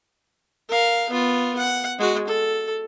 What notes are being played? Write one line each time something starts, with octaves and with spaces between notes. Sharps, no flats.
A#4 F5
B3 F4
F#5
G#3 F#4
A4